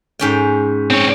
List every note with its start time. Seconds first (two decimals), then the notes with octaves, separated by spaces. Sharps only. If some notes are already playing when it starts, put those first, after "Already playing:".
0.19 G#2 C#4 G5
0.91 C4 C#5